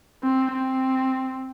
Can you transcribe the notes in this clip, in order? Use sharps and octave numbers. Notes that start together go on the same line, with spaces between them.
C4
C4